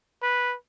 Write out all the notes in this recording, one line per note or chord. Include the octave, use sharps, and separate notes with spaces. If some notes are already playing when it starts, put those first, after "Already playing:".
B4